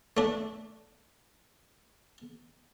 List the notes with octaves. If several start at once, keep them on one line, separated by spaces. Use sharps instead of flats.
A3 D4